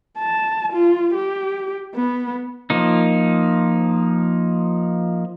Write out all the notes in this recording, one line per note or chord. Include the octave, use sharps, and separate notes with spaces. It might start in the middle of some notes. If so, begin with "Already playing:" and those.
A5
F4
G4
B3
F3 A#3 D#4